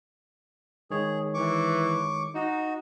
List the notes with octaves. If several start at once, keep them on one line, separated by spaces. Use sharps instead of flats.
D#3 G#3 G#4 C#5
E3 C#6 D6
D#4 F#4